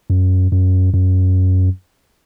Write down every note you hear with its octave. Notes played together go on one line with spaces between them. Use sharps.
F#2
F#2
F#2